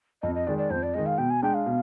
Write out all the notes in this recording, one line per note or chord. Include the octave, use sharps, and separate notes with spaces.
F2 D#5
D#5
D#3 G#3 D5
D5
F2 C5
D5
D#3 G#3 D#5
F5
B2 G5
G#5
G#3 D4 G5
F5
B2